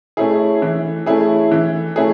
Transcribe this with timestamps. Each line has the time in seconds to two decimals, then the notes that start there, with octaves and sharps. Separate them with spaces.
0.17 A3 C#4 E4 G#4
0.62 E3
1.06 A3 C#4 E4 G#4
1.51 E3
1.96 A3 C#4 E4 G#4